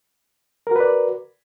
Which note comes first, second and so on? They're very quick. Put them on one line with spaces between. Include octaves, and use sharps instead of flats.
A#4 F#4 B4 D5